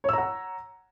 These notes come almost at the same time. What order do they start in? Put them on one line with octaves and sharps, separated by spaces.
C#5 E6 A#5 F#5